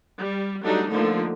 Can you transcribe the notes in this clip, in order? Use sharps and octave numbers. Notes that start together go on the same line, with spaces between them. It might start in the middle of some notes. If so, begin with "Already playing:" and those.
G3
F#3 G3 A3 D4 D#4
D3 F3 A3 A#3 D#4